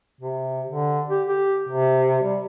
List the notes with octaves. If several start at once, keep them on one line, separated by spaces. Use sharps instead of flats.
C3
D3
G4
G4
C3
G3